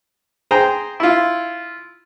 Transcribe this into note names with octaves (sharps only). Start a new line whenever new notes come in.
G#4 C5 G5 A#5
E4 F4